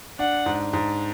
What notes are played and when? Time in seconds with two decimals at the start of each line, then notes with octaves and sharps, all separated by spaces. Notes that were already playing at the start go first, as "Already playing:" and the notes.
0.19 D4 F#5
0.46 G#2
0.73 G#2